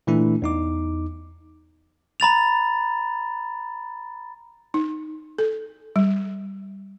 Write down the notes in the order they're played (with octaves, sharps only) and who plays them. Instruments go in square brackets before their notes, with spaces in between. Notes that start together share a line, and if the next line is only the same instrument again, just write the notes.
[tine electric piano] A#2 E3 A3 D4 E4
E2 D#4 D6
[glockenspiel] A#5 B5 A6 F7
[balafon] D#4
A4
G3